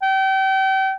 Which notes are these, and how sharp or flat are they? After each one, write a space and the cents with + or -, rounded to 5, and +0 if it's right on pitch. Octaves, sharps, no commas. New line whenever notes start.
G5 -35